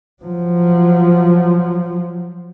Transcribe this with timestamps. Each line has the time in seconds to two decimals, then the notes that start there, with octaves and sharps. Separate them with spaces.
0.23 F3 F#3